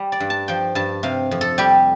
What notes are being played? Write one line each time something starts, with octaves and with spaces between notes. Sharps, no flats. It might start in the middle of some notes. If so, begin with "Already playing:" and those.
Already playing: G3
D5
G2
A5
F3 G5
G2 A5
C3 F5
F2
A4
G3 G4